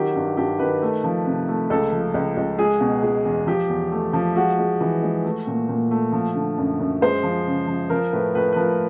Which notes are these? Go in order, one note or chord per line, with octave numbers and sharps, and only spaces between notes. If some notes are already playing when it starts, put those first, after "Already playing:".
Already playing: D#3 F#3 G4
G2
G2 G4
D#3 B4
A3
F3
C3
A3
C#2 A4
F3
C#2
C#2
G#3 G#4
B2
G#3
E2
F3 G4
E2
A3
F3
G#3 F#4
G#3
E3
G#3
A3
A#2
A#2
A3
F3
D3
F#2
F#2
G#3 C5
F3
C#3
F3
F3 A#4
A2 B4
A2 B4
B4
F3 A#4